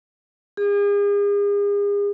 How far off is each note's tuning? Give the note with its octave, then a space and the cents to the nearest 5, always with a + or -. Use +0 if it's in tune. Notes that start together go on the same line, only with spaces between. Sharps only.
G#4 -40